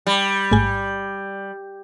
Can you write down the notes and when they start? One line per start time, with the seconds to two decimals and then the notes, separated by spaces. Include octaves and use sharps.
0.07 G3
0.51 A1 G#2 G#5